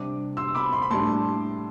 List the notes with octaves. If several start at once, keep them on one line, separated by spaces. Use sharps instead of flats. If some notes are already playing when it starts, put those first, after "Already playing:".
Already playing: C3 G3 D4 D6
C6 E6
B5 D6
C6
B5
A2 G3 D4 A5 C6